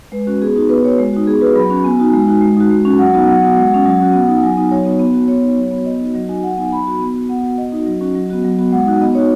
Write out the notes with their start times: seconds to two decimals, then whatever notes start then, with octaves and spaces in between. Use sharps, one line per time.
0.12 G#3 B4
0.27 C#4 F#4
0.42 B3 G#4
0.56 D#4 F#4
0.69 B3 B4
0.84 F#4 C#5
0.99 G#3
1.13 D#4 F#4
1.27 B3 G#4
1.41 F#4 B4
1.55 F#3 B5
1.70 C#4 F#4
1.84 B3 G#5
1.99 D#4 F#4
2.13 G#3
2.28 D#4 F#4
2.41 G#3
2.57 D#4 F#4
2.70 G#3
2.85 C#4 F#4
2.99 F#3 F#5
3.14 B3 D#4 F#4
3.27 F#3 F#5
3.42 B3 F#4
3.57 G#3
3.71 C#4 F#4
3.85 F#3
4.00 C#4 F#4
4.13 B3
4.28 D#4 F#4
4.43 F#3 G#5
4.57 B3 D#4 F#4
4.71 F#3 C#5
4.85 B3 D#4 F#4
4.99 B3
5.14 F#4
5.28 B3 C#5
5.42 D#4 F#4
5.57 F#3
5.71 B3 F#4
5.86 B3 D#5
6.00 D#4 F#4
6.15 F#3 D#5
6.29 D#4 F#4 G#5
6.43 F#3 F#5
6.57 B3 D#4 G#5
6.71 F#3 B5
6.86 B3 D#4 F#4
7.01 B3
7.15 F#4
7.29 B3 F#5
7.44 F#4
7.58 B3 D#5
7.72 D#4 F#4
7.86 F#3
8.01 C#4 F#4
8.15 F#3
8.30 B3 F#4
8.44 F#3
8.58 B3 F#4
8.72 G#3 F#5
8.86 D#4 F#4
9.01 B3 D#5
9.15 D#4 F#4 C#5